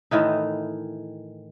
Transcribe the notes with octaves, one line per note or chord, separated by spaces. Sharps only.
A2 D#3 E3 D#4